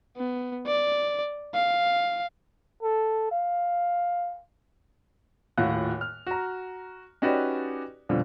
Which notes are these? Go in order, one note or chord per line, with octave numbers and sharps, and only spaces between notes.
B3
D5
F5
A4
F5
D#1 A2 F4 F#4 F#5 F#6
F6
F#4 A#5
C#4 D#4 F#4 G4 B4 D5
F2 B2 D3 F3 G3